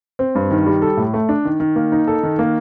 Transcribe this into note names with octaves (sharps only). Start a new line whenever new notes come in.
C4
G2
D#3
G3
A4
A2
A3
D4
D#3
D#3
A#3
D#4
A4
D#3
A#3